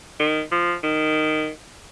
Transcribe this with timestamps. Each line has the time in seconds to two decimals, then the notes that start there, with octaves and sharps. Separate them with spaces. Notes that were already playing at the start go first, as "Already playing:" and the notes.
0.20 D#3
0.52 F3
0.83 D#3